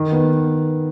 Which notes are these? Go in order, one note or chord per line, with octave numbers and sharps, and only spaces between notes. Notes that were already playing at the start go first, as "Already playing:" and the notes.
Already playing: D#3
B3